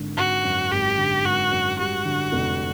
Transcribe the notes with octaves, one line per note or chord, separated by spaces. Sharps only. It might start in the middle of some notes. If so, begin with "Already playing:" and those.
Already playing: G#1 D3
G#1 F#4
F#2
G#1 G4
D3
G#1 F#4
F#2
G3 F#4
D3
F1